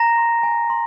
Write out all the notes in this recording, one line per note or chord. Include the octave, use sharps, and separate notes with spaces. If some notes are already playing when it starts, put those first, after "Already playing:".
Already playing: G#5 A#5 A#6
C6
G#5
C6